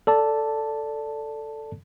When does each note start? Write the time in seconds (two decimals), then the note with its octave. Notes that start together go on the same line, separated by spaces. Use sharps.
0.07 A4 D5 A5